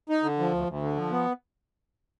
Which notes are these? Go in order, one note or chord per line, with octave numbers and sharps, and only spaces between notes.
D#4
D3
F3
D2
D2
D3
F3
B3